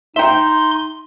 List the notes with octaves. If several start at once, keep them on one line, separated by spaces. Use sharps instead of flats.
D#4 E5 G5 C6